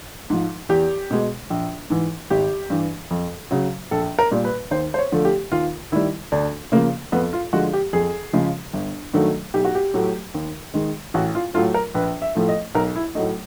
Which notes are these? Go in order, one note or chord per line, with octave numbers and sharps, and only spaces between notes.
G#2 F3
E2 G4
B2 G#3
A#1
G#2 E3
G#1 G4
G2 E3
F2
C#3 F#3
A#1 A4
A#4
A#2 G3
B4
D#2 C5
C5
C#5
D3 F3 A3
G4
D#2 F4
D#3 G3 E4
D2 D4
C#3 F3 A#3
F2 B3
F4
D3 F3 G#3 F#4
G4
F2 G#4
C#3 F3 G#3
G1
G2 D#3 F#3 A3
B1 G4
F#4
G4
A2 F#3 A3
D#2
D#3 G#3
A1 F#4
F4
A2 F#3 A3 F4
A#4
A#1 B4
E5
A2 F3 A3
D#5
B1 A#4
E4
A2 F#3 A3 D#4